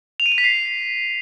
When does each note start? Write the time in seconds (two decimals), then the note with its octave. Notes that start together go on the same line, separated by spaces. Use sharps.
0.20 F7
0.26 D#7
0.32 F7
0.38 B6
0.44 C7